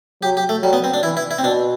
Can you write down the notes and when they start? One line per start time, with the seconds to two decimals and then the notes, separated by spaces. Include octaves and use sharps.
0.22 F#3 G4
0.37 G4
0.49 A3
0.63 F#3 G3
0.73 B3
0.84 C4
0.94 D4
1.03 E3 E4
1.17 E4
1.31 E4
1.38 C4
1.44 B2 D4